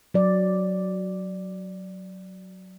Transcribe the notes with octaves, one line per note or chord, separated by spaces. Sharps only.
F#3 D5